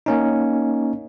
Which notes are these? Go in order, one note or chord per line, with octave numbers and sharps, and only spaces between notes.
A#3 C#4 D#4